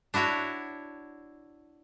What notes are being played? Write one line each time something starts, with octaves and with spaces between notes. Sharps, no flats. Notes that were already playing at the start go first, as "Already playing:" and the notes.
D4 E4 F#4 C#5